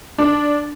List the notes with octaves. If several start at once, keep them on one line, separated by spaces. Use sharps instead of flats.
D4